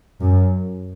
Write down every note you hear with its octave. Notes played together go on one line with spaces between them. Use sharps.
F#2